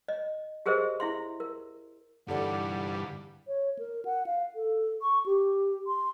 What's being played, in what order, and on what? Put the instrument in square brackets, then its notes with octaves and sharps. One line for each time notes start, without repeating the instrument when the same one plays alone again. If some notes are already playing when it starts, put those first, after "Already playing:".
[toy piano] D#5
G4 G#4 A#4 C5 D#5 E5
E4 E5 C6
A#4
[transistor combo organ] G2 [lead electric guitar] D3 E3 [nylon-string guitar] G3 A4 D5 [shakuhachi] F#5
[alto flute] C#5
A#4
F#5
F5
A4
C#6
G4
C6